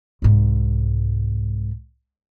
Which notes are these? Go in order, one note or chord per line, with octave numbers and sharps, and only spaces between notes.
C2 G#2